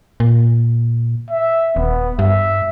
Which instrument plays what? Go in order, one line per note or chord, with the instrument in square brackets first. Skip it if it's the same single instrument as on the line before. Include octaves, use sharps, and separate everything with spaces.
[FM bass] A#2
[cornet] E5
[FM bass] D#1 [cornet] B3
[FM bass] G2 [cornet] E5